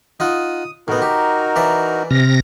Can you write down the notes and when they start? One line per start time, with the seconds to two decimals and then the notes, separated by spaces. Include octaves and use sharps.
0.20 D#4 F4 F#5 D#6
0.88 A2 B3 D#4 F#4 A#4
1.02 G4
1.56 E3 D5 E5
2.11 C3 F6 A#6